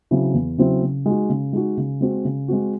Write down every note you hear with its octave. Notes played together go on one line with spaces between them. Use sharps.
C#3 F#3 C4 E4
E2
C#3 F#3 C4 E4
C#3
G#3 D#4 F#4
C#3
G#3 D#4 F#4
C#3
G#3 C4 F#4
C#3
G#3 C4 F#4